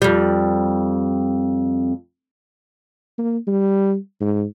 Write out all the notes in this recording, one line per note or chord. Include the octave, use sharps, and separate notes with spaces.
F2 G3
A#3
G3
G#2